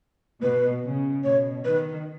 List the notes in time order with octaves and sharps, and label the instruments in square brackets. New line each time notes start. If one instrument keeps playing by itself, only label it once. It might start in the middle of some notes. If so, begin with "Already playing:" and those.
[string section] B2 [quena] B4
[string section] C#3
[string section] B2 [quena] C#5
[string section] D#3 [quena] B4